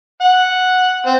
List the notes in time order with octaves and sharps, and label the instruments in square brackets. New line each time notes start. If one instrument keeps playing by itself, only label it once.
[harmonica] F#5
C4